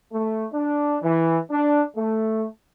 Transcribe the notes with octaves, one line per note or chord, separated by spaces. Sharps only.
A3
D4
E3
D4
A3